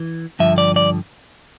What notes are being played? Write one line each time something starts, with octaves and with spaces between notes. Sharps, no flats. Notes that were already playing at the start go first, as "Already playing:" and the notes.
Already playing: E3
G2 D3 F3 E5
D5
D5